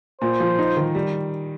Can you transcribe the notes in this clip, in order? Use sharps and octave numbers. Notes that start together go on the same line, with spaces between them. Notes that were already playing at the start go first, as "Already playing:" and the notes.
A#2 C5
F3
D#4
D#3
G3